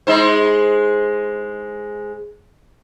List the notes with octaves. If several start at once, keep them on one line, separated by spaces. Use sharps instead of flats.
G#3 D#4 C5